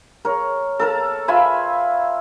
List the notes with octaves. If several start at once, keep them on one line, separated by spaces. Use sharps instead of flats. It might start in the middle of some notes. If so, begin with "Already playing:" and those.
A#4 C#5
A4 A#4 A5
F4 E5 G#5 B5